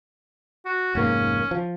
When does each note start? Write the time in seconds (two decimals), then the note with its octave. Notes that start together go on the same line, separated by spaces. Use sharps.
0.65 F#4
0.95 F1 G#2 A#3 C#4
1.51 F3